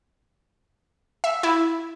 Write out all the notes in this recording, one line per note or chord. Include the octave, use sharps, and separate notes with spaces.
E5
E4